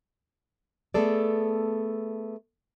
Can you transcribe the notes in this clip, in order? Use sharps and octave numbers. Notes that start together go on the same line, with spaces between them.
A3 B3 G#4 A4 D5